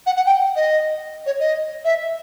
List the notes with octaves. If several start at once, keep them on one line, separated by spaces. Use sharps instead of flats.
F#5
F#5
G5
D#5
C#5
D#5
E5